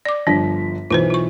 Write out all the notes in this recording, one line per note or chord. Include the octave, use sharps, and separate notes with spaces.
D5 D6
G1 F3 D4 B6
B1 E3 F4 B4 C5
F4 C#6